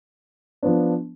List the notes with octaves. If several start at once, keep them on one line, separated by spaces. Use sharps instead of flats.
F3 B3 D4